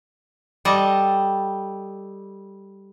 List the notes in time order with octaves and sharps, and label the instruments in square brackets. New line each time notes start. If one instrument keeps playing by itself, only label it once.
[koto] G3 A4 D#5